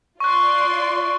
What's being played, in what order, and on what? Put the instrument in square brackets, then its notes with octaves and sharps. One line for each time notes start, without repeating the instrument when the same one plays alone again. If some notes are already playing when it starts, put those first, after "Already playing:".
[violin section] F4 D5 C6 [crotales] C#6 F#6